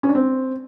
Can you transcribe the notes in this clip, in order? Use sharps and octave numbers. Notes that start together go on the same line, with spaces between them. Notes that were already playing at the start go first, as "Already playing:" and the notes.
C#4
D4
C4